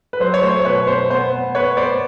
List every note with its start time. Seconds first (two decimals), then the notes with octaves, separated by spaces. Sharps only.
0.13 B4
0.20 F#3 C5
0.34 C#5
0.42 A3 C5
0.65 B2 B4 C#5
0.87 B2 C5
1.10 B3 C5
1.32 B3
1.55 B3 B4 C#5
1.77 B3 C5 D5